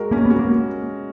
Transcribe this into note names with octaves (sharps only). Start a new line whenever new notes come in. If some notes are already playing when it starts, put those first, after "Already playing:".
Already playing: G#3 F#4 A#4
A#3 C#4
B3
F#4
A#3